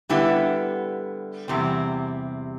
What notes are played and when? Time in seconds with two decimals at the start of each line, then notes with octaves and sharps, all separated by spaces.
0.09 D3 G3 B3 E4 G4
1.48 E2 C3 G3 C4